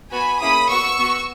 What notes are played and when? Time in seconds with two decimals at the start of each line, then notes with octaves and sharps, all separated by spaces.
0.12 B3 F#4 G#5 B5
0.40 A#3 C#4 E4 G#4 B5 D#6
0.69 B3 F#4 C#6 E6
0.98 B3 F#4